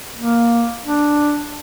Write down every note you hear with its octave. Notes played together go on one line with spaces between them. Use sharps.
A#3
D4